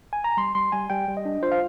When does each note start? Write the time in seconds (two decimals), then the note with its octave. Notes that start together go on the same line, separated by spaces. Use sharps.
0.13 G#5
0.24 A#5
0.37 G3 C6
0.55 G3 C6
0.72 G3 G#5
0.90 G3 G5
1.08 G3
1.17 D#5
1.25 D4
1.43 F4 C5
1.52 F5